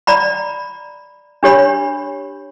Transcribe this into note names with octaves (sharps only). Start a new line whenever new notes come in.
D5 A#5 B5
D4 G4 C#5 B5